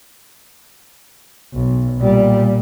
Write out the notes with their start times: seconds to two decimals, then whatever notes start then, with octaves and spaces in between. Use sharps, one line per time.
1.54 B1
1.98 A#2 G3